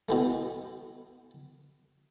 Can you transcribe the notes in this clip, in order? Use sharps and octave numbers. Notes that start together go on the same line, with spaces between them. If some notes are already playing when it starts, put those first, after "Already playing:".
B2 E3 A3